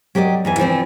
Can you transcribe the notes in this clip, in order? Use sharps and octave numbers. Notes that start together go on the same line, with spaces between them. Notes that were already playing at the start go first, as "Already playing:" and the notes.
F#3 G4 A#4 D5 D#5
E2 E3 G#5
E3 F3 C4 D4